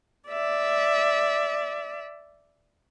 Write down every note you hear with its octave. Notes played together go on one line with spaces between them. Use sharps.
D5 E5